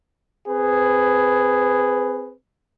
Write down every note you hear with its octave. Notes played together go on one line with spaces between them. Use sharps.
C4 G#4 B4